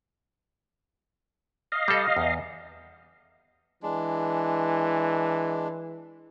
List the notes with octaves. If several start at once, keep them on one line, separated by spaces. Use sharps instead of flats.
D#5 F5
G3 A4
E2
E3 G#3 D4